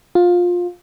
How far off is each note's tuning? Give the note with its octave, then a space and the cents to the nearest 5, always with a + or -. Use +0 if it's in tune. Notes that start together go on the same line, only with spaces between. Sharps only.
F4 +20